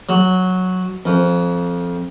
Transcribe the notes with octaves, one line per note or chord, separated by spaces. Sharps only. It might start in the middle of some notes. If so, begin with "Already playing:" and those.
F#3
F2